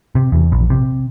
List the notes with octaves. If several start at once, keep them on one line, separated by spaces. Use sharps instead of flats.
C3
E2
A#1
C3